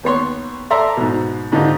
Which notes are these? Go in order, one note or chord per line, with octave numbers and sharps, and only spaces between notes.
D#2 B3 C#5 C6
A4 D5 E5 A#5 C6 D6
G#2 B2
G#2 D3 D#3 D#4 F4 G4